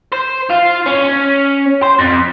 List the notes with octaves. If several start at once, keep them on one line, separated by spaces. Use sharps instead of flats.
C5
F4
C#4
C5
F2